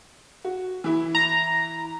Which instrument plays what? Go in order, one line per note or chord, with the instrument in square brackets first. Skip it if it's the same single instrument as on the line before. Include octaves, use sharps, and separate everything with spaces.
[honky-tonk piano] F#4
E3 E4
[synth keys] A#5